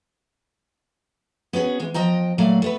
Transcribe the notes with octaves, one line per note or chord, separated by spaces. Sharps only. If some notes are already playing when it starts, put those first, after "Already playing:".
B3 C#4 F#4 G#4
E3 G#3
F3 D#5 G5 A#5
A#2 F#3 A3 D5 F5
A3 B3 B4